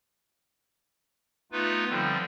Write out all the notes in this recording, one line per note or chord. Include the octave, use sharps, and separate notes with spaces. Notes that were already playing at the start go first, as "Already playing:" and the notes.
A3 B3 D#4 F4 B4
D3 F3 G3 C4